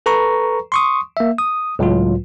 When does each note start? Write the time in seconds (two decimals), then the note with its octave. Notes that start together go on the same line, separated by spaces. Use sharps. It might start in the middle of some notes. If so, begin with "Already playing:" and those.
0.06 A4 B4 A#5 C#6
0.72 C6 C#6 D#6
1.17 A#3 E5
1.38 D#6
1.79 C#2 A2 F#3 F4